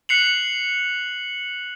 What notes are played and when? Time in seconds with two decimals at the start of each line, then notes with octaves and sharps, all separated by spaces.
0.09 F#6 C7 C#7 F7 F#7